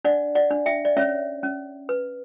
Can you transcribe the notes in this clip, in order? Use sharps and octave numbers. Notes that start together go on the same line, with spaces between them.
D4 D5 F#5
D5 F#5
D4
E5 G5
D5
C#4 C#5 E5
C#4
B4